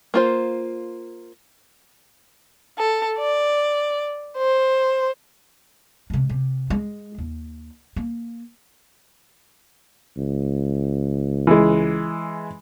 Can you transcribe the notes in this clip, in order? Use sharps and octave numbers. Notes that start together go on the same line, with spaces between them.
A#3 F4 C5
A4
D5
C5
C3 G#3
C3
G#3
D#2
A#3
C#2
E3 G#3